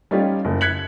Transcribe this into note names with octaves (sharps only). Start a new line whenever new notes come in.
G3 C#4 D#4 F4 G4 D5
F#1
F#6 G#6 B6 C#7 F#7